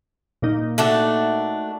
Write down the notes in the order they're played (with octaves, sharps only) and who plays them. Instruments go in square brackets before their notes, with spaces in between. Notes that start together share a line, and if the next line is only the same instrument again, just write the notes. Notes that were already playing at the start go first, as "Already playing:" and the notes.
[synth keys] A#2 A#3 D#4
[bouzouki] A3 D4 F#4